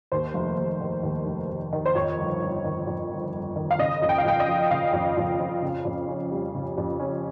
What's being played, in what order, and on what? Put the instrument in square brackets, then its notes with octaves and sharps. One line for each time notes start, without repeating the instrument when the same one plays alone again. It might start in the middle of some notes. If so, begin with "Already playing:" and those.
[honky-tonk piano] D#2 C5
F1
F1
D#3
D#2
F1
F1
D#3
C5
F2 C#5
G1
G1
D#3
F2
G1
G1
D#3
F5
C#3 D#5
F2
G5
F5
F2 G5
D#5
F3
C#3 F5
F2
F2
F3
C#3
F2
C#4
G3
C#3
F2
C#4